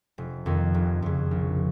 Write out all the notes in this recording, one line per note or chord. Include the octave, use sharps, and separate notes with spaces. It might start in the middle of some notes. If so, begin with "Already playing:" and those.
F1
F2 D#3
F1
F2 C#3
A#1